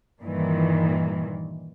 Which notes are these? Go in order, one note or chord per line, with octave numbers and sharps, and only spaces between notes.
G2 A#2 D#3 E3